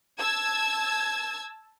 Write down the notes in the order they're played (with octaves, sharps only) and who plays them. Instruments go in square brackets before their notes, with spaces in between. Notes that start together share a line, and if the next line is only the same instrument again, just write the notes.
[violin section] A5 E6 G#6